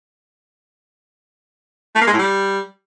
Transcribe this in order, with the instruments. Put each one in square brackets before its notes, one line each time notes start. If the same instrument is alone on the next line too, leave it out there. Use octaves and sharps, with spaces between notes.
[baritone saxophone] A3
A#3
G#3
A2
G3